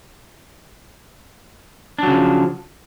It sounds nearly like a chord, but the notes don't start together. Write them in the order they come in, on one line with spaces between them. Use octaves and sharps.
D4 F#3 C#3 F3